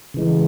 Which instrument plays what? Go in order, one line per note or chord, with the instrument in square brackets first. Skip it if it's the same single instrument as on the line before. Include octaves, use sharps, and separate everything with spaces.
[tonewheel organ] C#3 E3 G#3